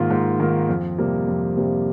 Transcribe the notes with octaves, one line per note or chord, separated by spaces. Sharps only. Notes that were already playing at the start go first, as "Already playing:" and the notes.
Already playing: G#2 D#3 A#3 F4
G#2
D#3 A#3 F4
F2
C3 G3 A#3
F2
C3 G3 A#3